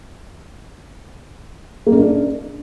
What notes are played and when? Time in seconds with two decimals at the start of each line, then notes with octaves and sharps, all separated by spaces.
1.87 A#3
1.92 C#4
1.98 D4